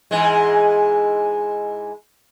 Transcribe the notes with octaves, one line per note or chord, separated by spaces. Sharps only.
G#2 E3 G#3